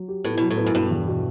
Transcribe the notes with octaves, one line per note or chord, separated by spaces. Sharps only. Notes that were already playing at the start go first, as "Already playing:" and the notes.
Already playing: F#3
G4
A2 B3
B2 F#3
A2
B3
F#2
G2 B2
E2
B2